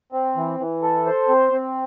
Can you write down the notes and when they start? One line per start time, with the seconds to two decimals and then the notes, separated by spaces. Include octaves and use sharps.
0.12 C4
0.36 E3
0.60 E3
0.82 A4
1.06 C5
1.29 C4
1.52 C4